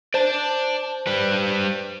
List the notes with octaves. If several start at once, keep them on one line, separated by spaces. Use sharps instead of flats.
C5 D5 A5
G3 B4